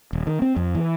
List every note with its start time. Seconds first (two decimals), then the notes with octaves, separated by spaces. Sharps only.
0.13 D#1
0.27 D#3
0.42 C4
0.56 F2
0.75 E3